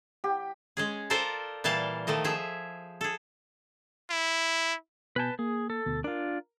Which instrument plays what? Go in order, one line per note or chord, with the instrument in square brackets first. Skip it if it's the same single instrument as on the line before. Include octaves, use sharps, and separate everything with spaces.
[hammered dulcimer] G4
[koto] G#3 C#4 G#4
F4 A4 A#4 C5 D5
A#2 E3 G3 F5 A5
D#3 F3 A3 D#5
F3 G#4 E5
G#4 A4
[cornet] E4
[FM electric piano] B2 G#5 G6 [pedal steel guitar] B4 A5
[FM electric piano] A#3 [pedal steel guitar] G#4
[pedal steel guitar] A4
[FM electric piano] D2 B2
[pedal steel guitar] D4 F4 [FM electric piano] A#4